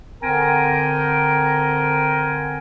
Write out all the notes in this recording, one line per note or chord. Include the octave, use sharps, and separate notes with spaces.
D3 C4 A#4 G5 G#5 A#5